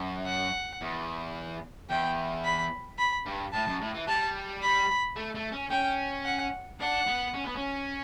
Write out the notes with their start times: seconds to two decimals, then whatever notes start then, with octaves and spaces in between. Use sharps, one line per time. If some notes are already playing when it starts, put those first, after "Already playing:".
Already playing: F#2
0.26 F#5
0.81 E2
1.90 E2 G5
2.44 B5
2.98 B5
3.26 G2
3.53 A2 A5
3.67 F#2
3.81 A2
3.94 E3
4.08 G3 A5
4.63 B5
5.16 A3
5.35 A3
5.52 C#4
5.70 C#4 G5
6.25 F#5
6.80 D4 F#5
7.07 B3
7.34 C#4
7.45 B3
7.56 C#4